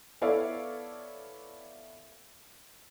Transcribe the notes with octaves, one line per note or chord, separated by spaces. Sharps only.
B3 E4 A4 C#5 D5 F5